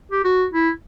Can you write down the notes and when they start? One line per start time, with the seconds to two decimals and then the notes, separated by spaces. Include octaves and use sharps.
0.12 G4
0.24 F#4
0.54 E4